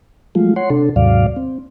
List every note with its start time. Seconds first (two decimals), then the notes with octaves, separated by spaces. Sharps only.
0.35 F3 F#3 G#3 A3 F4
0.56 C#5 F#5 C6
0.70 C3 D4 A4
0.96 D#2 G#2 C3 F#3 D5 F5
1.36 C4